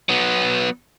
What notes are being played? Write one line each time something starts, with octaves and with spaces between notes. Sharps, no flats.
F#3 B3